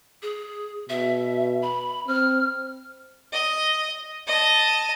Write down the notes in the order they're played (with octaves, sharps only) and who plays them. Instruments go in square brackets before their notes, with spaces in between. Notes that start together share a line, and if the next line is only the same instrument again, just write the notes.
[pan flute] G#4
[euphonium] B2 [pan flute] E5
[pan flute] B5
[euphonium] C4 [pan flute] F6
[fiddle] D#5
D#5 A5